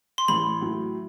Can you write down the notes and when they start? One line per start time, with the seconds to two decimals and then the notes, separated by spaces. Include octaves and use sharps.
0.18 C6
0.28 A1 B5
0.61 A2 F#3